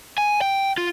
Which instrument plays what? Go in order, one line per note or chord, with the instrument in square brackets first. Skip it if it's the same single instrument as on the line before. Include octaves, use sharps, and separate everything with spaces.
[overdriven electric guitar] G#5
G5
F4